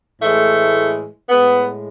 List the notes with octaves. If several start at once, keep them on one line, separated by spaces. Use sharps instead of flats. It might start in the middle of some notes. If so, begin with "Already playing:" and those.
A2 E3 G#3 A3
A2 G#3 B3